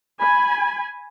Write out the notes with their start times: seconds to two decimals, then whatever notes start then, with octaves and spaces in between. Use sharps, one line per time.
0.21 G#5 B5